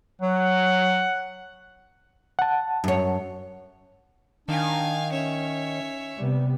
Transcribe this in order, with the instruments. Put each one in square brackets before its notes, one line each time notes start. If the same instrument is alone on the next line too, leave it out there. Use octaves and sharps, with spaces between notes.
[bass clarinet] F#3 [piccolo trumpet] F#5
[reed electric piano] F#5 A5
[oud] F#2 C#5
[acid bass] D#3 [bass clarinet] D4 [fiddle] F5 G#5
[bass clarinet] C#4 [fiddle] C#5 E5
[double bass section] C3 G3 B3